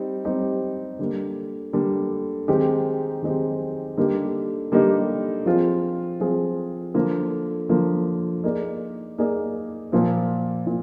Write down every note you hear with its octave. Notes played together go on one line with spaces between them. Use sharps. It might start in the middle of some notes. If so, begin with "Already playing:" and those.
Already playing: G3 C4 D#4
G3 C4 D#4 G4
D3 G3 A#3
D3 G3 A#3
D#3 G#3 C4 D#4 G4
D#3 G#3 C4 D#4 G4
D3 G3 A#3 D#4 G4
D3 G3 A#3 D#4 G4
F3 C4 F4 G#4
F3 C4 F4 G#4
D3 F3 A#3
D3 F3 A#3
A#3 D#4 G#4 D5
A#3 D#4 G#4 D5
A#2 F3 A#3
A#2